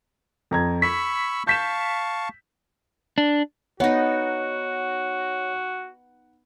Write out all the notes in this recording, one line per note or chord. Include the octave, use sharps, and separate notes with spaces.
F2 A#5 G#6
B5 C#6 E6 B6
F5 A5 C#6 G6 B6 E7
D4
B3 D#4 F#4 C#5 F#5